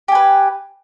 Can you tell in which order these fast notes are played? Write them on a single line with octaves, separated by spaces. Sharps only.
G4 G#5 B4